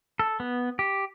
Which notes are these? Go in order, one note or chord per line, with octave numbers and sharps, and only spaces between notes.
A4
B3
G4